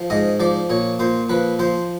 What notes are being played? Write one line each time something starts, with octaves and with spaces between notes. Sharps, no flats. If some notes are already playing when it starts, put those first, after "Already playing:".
Already playing: F3
G#2 D#5
F3 D5
A#2 C#5
A#2 C5
F3 B4
F3 C5